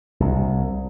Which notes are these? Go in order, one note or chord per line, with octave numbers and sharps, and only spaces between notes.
C2